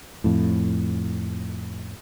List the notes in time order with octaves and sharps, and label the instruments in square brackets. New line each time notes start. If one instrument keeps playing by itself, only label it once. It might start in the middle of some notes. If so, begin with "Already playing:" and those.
[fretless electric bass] F2 A2